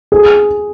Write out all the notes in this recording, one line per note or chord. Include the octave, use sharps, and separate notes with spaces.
G#4